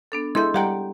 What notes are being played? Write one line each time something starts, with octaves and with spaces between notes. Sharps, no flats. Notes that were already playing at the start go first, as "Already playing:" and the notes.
B3 D4 A4
G#3 E4 A4 C6 G6
G3 G4 F#5 G5 A#5